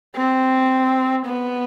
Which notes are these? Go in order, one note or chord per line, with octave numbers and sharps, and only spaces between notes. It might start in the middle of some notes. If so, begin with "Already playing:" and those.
C4
B3